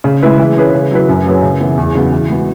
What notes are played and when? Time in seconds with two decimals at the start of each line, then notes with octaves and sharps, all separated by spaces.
0.04 C#3
0.22 G#3 E4 B4
0.39 E3
0.57 C#4 G#4 B4
0.74 C#3
0.91 F#3 E4 B4
1.09 F#2
1.25 F#3 C#4 G#4 B4
1.43 C#3
1.60 E3 B3 E4 B4
1.77 E2
1.95 C#3 F#3 B3
2.12 E3
2.29 G#3 B3 F#4